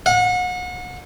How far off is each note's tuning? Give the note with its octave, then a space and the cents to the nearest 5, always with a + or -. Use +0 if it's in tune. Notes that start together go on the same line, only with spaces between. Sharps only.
F#5 -35